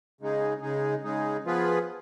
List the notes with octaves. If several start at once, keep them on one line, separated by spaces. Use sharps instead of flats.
C#3 G#3 D#4 G#4
C#3 G#3 D#4 G#4
C#3 G#3 D#4 G#4
F3 B3 F4 G#4 B4